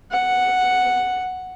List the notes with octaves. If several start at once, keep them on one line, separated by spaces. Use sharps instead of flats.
F#5